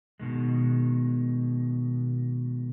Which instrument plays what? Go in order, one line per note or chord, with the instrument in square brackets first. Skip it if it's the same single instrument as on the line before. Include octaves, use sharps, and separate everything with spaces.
[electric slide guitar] B2 D#3 G#3